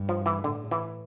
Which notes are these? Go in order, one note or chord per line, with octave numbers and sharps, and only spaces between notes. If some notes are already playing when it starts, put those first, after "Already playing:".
Already playing: G2
F3
E3
A2 D3
E3